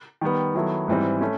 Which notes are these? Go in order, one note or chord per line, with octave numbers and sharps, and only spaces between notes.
D#3 G3 B3
D#3 F#3 B3 E4 A4
G#2 E3 G3 C4
A3 C#4